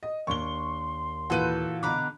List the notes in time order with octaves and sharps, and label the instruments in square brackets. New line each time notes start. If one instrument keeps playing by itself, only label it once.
[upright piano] D#5
[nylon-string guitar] D#2 D4 [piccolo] C6 [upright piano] C#6 G7
[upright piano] A#2 E3 F#4 [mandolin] A4 B4 G6
[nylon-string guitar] B2 D3 [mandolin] A#5 B5 D6 [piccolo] F#6